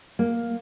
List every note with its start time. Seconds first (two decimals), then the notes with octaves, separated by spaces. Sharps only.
0.19 A#3